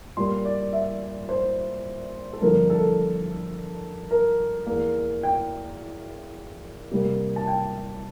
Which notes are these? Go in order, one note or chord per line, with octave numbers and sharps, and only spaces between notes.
A#2 G3 A#3 C6
D5
E5
C5
A4
G2 D3 F3 A#3 A#4
A4
A#4
E2 E3 A#3
G5
C3 G3 A#3
A5
G5